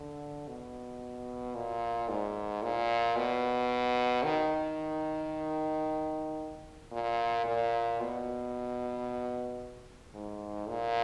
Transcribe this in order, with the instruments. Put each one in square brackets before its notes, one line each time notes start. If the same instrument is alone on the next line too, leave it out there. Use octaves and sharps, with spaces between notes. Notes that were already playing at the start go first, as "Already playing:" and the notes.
Already playing: [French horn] D3
B2
A#2
G#2
A#2
B2
D#3
A#2
A#2
B2
G#2
A#2